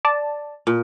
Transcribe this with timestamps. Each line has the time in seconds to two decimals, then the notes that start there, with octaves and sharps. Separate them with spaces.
0.05 D5 A5
0.67 A#2